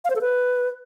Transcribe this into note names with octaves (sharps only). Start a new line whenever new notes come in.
F5
C5
A4
B4